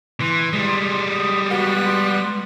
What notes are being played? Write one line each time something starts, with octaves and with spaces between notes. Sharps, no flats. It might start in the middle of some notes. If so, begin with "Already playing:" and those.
E3 C6
G3 G#3
D#6
B3 F#4
C6